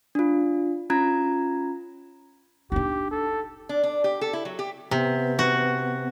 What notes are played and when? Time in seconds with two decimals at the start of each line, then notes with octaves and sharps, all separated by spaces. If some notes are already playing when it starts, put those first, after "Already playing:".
0.15 D4 F4
0.90 C#4 F4 A#5 G#6
2.72 D4 D#4 G4
3.11 A4
3.69 D4
3.83 D4
4.04 G4
4.21 A4
4.33 E4
4.45 F#3
4.59 G4
4.91 C3 B3
5.39 F#4